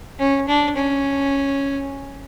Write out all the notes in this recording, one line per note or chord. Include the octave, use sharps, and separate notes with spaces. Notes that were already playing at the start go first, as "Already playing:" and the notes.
C#4
D4
C#4